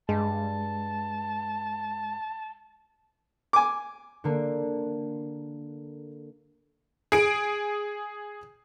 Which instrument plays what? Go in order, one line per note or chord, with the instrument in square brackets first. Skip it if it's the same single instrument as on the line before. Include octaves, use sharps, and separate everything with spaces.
[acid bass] G2 [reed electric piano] G#3 [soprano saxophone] A5
[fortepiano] G#5 D6
[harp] D3 A#3
[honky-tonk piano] G#4 D7